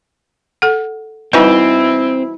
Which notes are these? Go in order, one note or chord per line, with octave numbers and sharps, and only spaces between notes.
A4 F#5
B2 E3 G3 C4 D#4 E4 B4